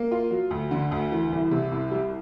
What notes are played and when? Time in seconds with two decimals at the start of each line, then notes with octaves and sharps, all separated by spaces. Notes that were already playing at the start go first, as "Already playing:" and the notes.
Already playing: A#3
0.11 F4
0.31 F#3
0.51 D2
0.71 D3
0.91 D2
1.12 E3
1.32 C2
1.51 C3
1.72 C2
1.91 G3